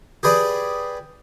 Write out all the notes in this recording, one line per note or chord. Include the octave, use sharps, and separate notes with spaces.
G4 G#4 B4 D5